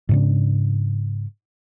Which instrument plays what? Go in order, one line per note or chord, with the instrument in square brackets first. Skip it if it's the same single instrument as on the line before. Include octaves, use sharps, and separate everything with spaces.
[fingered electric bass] G#2 C#3 D4